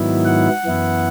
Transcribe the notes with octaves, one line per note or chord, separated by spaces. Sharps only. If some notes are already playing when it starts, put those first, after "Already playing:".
Already playing: G#2 D#3 F#3 B3 E4
F#5
F#2 E3 B3 E4